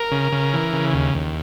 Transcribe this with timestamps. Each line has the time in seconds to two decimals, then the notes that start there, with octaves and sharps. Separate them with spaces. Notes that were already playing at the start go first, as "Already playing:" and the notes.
Already playing: A#4
0.12 C#3
0.32 C#3
0.53 E3
0.73 C#3
0.93 D#2
1.15 D#2